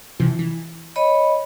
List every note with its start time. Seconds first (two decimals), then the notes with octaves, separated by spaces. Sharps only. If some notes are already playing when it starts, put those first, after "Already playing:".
0.20 C3 E3 F3
0.39 E3
0.96 C#5 D#5 B5